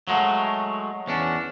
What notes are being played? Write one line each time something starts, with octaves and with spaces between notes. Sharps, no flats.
F#3 G#3 A3
E2 C#4 D4